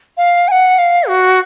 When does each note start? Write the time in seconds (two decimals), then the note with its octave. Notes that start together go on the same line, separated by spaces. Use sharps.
0.17 F5
0.48 G#5
0.51 F#5
0.78 F5
1.08 F#4